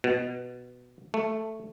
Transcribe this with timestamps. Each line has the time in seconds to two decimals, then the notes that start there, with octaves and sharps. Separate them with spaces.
0.04 B2
1.14 A3